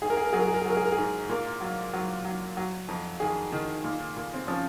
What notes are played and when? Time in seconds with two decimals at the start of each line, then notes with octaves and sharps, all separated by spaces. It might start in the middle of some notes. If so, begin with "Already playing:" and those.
0.02 G#2 G#4
0.10 A#4
0.17 G#4
0.25 A#4
0.33 F#3 G#4
0.39 A#4
0.47 G#4
0.54 A#4
0.62 G#4
0.65 F#3 A#4
0.77 G#4
0.85 A#4
0.92 G#4
0.98 G#2
1.29 A#2 A#4
1.61 F#3
1.93 F#3
2.25 F#3
2.57 F#3
2.88 F2
3.20 D#3 G#4
3.52 D#3
3.84 A#2
4.16 A#2
4.34 C4
4.47 F3 C#4